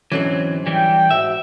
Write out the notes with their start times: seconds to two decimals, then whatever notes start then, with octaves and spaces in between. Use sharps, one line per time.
0.12 G#2 D3 E3 F#3 C4 C#4
0.66 E3 G3 G5
1.11 G#2 F#4 E5